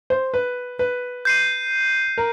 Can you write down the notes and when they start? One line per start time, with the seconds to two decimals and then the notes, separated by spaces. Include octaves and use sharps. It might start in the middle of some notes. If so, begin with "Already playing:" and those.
0.10 C5
0.34 B4
0.79 B4
1.25 G6 C7 D#7
2.18 A#4